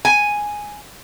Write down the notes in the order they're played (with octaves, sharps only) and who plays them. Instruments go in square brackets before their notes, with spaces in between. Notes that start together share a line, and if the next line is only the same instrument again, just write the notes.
[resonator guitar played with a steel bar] G#5